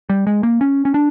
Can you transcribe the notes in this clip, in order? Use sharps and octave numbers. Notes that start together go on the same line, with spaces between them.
G3
G#3
A#3
C#4
C#4
D4